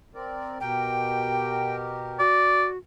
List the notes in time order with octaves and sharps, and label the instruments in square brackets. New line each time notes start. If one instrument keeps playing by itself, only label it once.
[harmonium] C4 A#4 D5
[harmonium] B2 G4 A#4 [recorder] G5
[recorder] F#4 [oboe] D5